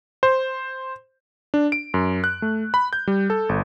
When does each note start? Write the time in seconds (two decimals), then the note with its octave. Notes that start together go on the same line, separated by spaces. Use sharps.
0.23 C5
1.54 D4
1.72 D7
1.94 F#2
2.24 F#6
2.42 A3
2.74 B5
2.93 G6
3.07 G3
3.30 A4
3.49 G1